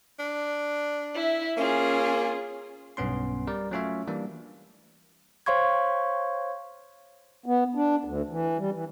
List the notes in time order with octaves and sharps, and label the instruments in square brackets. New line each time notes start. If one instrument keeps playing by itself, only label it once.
[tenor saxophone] D4
[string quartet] E4 E5
[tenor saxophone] A#3 [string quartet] C#4 F4 G#4
[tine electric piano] B1 G2 B3 C#4 C6
G3 A#4 D5
F#3 A3 C#4 F4 C#5 E5
E3 G3 A#3 D4
[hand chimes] C5 C#5 F5 C6 C#6 G#6
[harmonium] B3
D4
D2
E3
G3
E3